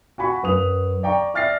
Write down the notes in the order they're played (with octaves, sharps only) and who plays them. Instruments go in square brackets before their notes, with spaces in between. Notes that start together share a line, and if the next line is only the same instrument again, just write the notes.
[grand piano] F#4 G#5 B5 C#6
F#2 B4 D#6 F7
D5 G5 A#5 C#6
D5 E5 F6 A6 A#6 C7